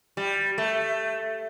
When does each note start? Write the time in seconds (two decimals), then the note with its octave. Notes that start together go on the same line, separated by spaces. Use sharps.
0.17 G3
0.58 A3